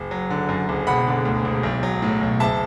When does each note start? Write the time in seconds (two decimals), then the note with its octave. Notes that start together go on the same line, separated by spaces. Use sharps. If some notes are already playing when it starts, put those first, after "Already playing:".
Already playing: F#1
0.11 F#3
0.30 D3
0.49 F#2
0.69 F#1
0.87 E1 F#5 B5
1.07 D3
1.25 D2
1.45 E1
1.63 B1
1.83 F#3
2.02 A2
2.21 B1
2.40 F#1 E5 A5